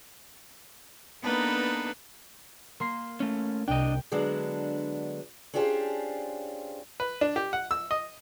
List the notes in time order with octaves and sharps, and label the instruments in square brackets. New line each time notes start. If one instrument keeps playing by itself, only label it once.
[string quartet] A#3 B3 D4 D#4 A4 B4
[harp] A#3 C6 C7
[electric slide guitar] A3 C#4
[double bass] C2 [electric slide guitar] D4 D#5 [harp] G5
[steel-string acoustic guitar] D3 F#3 G#3 B3 D4
C#4 D4 F4 G4 G#4 C5
[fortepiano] B4
D4
G4
F#5
E6
D#5